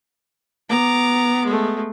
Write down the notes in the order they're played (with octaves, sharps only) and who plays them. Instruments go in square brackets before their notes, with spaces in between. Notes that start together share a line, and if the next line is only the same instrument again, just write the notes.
[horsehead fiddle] B3 [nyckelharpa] A#5 D6
[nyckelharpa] G#3 A3